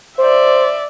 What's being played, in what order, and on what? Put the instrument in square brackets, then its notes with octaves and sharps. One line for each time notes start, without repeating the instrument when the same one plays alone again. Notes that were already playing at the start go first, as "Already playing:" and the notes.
[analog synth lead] C5 [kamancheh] D5 E5